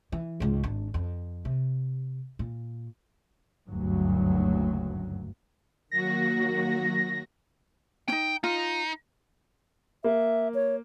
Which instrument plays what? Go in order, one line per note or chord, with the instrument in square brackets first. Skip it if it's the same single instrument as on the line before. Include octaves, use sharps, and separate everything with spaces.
[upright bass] E3
C#2 G#2
G#1 D4
F2
C3
A#2
[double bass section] F#1 D2 G2 F#3
[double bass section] D#3 A#3 [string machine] F#3 F#4 [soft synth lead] A#6
[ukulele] C#4 D#4 [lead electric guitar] G5
[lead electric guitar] D#4 [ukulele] F4
[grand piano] A#3 [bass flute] E5
[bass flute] C#5